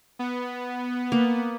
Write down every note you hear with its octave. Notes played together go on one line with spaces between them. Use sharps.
B3
A#3